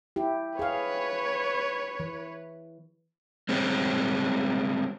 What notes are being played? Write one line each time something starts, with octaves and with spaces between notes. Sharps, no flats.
E4 G4
G#4 B4 C#5 F5
E3
G3 G#3 C4 C#4